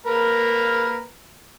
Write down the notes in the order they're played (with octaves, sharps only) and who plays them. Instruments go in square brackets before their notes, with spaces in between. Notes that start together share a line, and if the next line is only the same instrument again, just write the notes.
[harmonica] A#3 A#4 B4